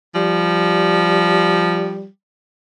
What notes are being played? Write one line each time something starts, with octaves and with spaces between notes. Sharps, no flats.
F3 G3